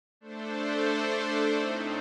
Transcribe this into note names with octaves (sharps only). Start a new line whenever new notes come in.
A3 D4 A4 C5
A2 A3 C4 D#4